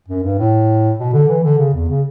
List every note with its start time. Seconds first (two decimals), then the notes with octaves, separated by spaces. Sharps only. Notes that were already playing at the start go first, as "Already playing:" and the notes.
0.09 F#2
0.23 G2
0.39 A2
0.99 B2
1.13 D3
1.28 E3
1.43 D3
1.58 C#3
1.74 E2
1.89 C#3